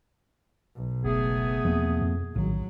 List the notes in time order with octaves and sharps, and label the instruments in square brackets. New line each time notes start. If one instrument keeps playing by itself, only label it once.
[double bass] B1
[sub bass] F#1 [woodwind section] A3 B3 G#4
[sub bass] E2 [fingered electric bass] F3 A#3 C4
[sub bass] F2
[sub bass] A#1 [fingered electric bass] A2 D#3 [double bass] F#3